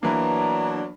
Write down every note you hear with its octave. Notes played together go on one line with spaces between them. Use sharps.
E3 F#3 A#3 B3 D4 A#5